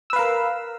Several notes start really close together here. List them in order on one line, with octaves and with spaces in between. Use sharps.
E6 B4 F5 A#4